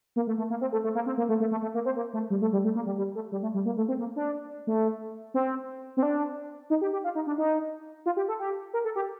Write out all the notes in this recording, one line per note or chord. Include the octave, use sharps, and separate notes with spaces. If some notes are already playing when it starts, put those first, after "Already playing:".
A#3
A3
A3
A#3
C4
A3
A3
A#3
C4
A#3
A3
A3
A3
A3
A#3
C4
A#3
A3
G3
A3
G3
A3
A#3
G3
G3
A3
G3
A3
G3
A#3
A3
C4
A#3
D4
A3
C4
C4
D4
D#4
G4
G4
F4
D#4
D4
D#4
F4
G4
A4
G4
A#4
A4
G4